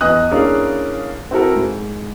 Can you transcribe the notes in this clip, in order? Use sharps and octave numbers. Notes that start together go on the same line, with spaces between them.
E2 B3 D#5 D#6 F#6
A#3 C#4 D4 E4 G#4 A#4
C4 E4 F#4 A4 A#4
G#2